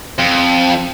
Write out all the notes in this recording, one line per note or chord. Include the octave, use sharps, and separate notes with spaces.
F2